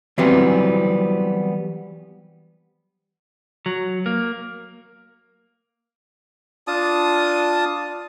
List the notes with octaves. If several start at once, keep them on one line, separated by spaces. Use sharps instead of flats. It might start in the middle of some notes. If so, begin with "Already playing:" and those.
E3 F#3 G3 B3 C4
F#3
A#3
D4 F4 A5 D#6